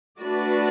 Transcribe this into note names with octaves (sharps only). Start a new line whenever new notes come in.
A3 D4 F#4 B4 D5